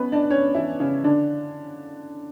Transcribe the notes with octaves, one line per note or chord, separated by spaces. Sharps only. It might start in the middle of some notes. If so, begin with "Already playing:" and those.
Already playing: B3 C#4 B4
D4 D5
C#4 C#5
E3 E4
C#3 C#4
D3 D4